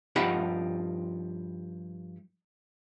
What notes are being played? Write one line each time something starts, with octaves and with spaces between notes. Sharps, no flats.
G2 F3 D#4 G4 F#5 B5